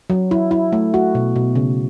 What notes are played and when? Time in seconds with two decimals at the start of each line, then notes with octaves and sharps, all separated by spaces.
0.10 F#3
0.31 E4
0.51 E4
0.73 A3
0.94 F#4
1.15 B2
1.36 B2
1.55 C#3